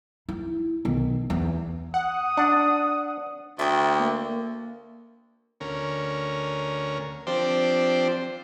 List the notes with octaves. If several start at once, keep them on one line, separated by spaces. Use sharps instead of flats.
E4
B1 D#3
E2
F#5 D#6
D4 F#5
D2 E5 G5
A#3
D2 C#4 A#4
F3 C4 D4 G4 C5